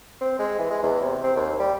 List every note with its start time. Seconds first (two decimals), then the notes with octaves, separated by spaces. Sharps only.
0.21 C4
0.39 G#3
0.59 E3
0.70 G#3
0.82 E2
1.01 C3
1.23 C4
1.36 D#2
1.59 G3